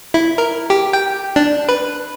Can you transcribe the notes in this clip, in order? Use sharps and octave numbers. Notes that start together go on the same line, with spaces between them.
E4
A#4
G4
G5
D4
B4